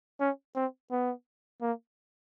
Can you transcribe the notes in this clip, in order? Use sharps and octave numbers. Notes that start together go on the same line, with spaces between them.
C#4
C4
B3
A#3